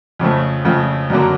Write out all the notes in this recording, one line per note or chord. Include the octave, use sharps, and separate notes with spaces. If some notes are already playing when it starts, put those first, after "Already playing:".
F2 C#3 F3 A3
F2 C#3 F3 A3
F#2 D3 F#3 A#3